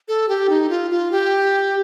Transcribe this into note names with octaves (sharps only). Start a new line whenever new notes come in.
A4
G4
D#4
F4
F4
G4